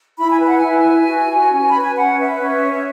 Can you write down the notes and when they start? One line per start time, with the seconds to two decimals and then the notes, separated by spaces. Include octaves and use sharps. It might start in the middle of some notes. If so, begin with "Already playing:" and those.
0.18 E4 B5
0.32 G#5
0.41 B4 F#5
0.59 E4 G#5
0.85 B4
1.08 F#4
1.30 F#4
1.52 C#4
1.70 B5
1.75 B4
1.82 G#5
1.96 C#4 F#5
2.18 B4 E5
2.41 C#4
2.63 C#5